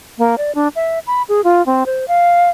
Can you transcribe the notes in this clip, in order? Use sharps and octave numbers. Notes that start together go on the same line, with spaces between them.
A#3
D5
D4
E5
B5
G#4
F4
C4
C5
F5